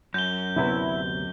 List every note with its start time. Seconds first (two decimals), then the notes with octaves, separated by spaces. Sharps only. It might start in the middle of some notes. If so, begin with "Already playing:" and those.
0.14 F#2 G6 G7
0.56 D2 C3 B3 E4